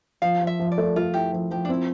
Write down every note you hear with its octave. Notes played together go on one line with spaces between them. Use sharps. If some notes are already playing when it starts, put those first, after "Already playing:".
F3 F5
F3
E5
F3
D5
A3
A3 F4
E4 G4
F3
F3 G4
D4
C4 E4